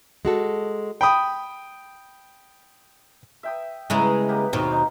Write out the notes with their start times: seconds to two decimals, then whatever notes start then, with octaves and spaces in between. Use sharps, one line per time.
0.25 G#3 F#4 A4
1.01 G5 B5 D#6
3.43 E5 G5 D#6
3.90 C#3 G#3 B3 E4 A#5
4.28 A#3 B3 G4
4.53 D#2 B2 C4 A#4
4.71 D#4